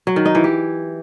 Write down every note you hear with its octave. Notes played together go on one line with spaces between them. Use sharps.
F#3
D#3
D#4
E3
G4